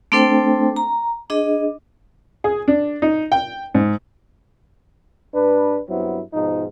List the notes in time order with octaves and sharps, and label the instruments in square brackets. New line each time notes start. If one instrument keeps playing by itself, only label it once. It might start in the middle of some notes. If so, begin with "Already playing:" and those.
[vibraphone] A3 C4 D4 A4 C5 G5
A#5
D4 G#4 D#5
[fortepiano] G#4
D4
D#4
G5
G#2
[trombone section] G2 D4 B4
G2 F#3 B3 C4 E4
G#2 B2 F3 D#4